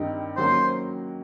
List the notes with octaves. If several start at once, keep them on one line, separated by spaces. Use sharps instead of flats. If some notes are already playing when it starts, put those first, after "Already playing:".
Already playing: G2 D#3 G3 C4 D#4
D#3 F#3 A#3 C#4 F#4 C5